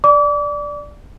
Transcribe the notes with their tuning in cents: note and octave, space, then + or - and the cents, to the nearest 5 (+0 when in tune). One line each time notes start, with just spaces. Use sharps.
D5 +0 D6 -35